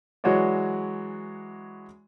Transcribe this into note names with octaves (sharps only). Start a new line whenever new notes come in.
E3 F#3 G#3 F#4 C#5 D5